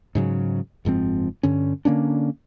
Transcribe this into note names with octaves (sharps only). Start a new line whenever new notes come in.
G#2 C#3 F#3
F#1 G#2 F3 C4
G2 D3 C#4
D3 A#3 C#4 D4